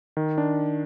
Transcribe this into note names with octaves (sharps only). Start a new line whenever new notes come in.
D#3
D4